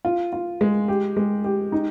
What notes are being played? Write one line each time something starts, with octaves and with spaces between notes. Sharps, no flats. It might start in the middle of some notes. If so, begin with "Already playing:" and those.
F4
F4
G#3
G4
G#3
G4
D#4